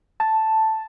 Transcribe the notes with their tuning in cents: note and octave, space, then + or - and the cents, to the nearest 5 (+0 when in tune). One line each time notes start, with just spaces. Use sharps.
A5 +0